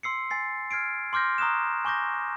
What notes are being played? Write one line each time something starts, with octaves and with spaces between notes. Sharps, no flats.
C6 E6 C7 C#7
G#5 A6 C7
F6 G#6 C7 D7
C6 D6 F6 G6 A#6
A#5 C#6 D#6 F6 F#6 E7
G#5 C#6 D6 G6 A#6